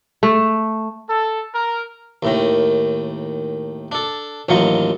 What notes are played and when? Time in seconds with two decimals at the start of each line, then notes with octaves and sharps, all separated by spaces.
0.23 A3
1.10 A4
1.55 A#4
2.23 D#2 A2 D#3
3.92 D4 A4
4.49 A1 D#2 F#3 D#4 F4 C#6